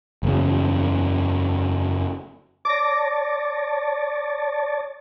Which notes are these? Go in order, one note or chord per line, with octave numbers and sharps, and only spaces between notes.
F#1 E2 C#3
C#5 D5 A5 D6 A#6